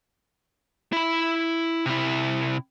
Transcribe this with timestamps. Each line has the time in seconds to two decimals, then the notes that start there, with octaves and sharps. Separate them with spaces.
0.93 E4 B5
1.86 C3 E4